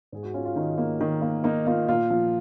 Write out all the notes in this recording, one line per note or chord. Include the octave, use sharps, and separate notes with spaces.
G#2 G#4
F#4
C#4 F4
F4
D#3 D#4
A#3
D#3
A#3
A#3 D#4
A#3 F4
A#2 F4
F3